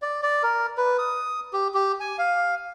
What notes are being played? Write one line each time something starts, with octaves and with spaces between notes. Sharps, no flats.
D5
D5
A#4
B4
D#6
G4
G4
G#5
F5